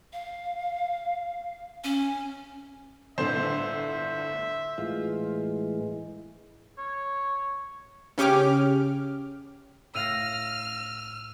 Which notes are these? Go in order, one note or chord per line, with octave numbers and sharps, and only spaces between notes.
F5
C#4
G1 A2 D3 C5 E5
A2 E3 G#3 F4
C#5
C#3 C#4 G4 D6 F6
A2 F5 E6 F6 A#6 D#7 F7